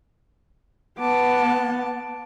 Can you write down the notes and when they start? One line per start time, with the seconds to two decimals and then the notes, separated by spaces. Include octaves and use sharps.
0.99 B3 A5 D6